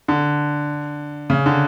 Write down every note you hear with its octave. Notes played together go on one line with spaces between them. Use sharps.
D3
C#3
D3